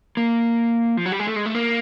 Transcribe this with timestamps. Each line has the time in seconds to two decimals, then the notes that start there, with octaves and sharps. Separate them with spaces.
0.17 A#3
0.97 F3
1.06 F#3
1.12 G3
1.19 G#3
1.27 A3
1.36 G#3
1.46 A3
1.55 A#3